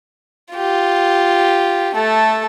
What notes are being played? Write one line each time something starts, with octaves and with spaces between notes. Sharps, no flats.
F4 G4
A3 A4